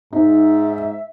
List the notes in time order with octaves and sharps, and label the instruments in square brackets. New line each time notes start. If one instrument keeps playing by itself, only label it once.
[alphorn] G#2 [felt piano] D#4 [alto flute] E5